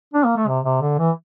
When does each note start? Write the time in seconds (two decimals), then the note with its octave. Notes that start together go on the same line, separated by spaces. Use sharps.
0.14 D4
0.25 A#3
0.37 A3
0.48 C3
0.65 C3
0.82 D3
0.98 E3